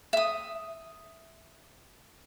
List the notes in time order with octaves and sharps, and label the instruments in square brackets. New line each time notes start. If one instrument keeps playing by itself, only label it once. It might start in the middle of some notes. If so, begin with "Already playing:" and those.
[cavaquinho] E5 D#6